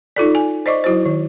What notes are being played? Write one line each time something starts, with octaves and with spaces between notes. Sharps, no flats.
D#4 F4 A4 D5
G#5
C5 D5 D#5 C#6 D6
F#3 E4 F#4 C5
D#3